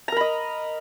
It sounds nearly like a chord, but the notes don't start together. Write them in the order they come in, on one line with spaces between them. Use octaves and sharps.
A#5 A#4 B5 D#5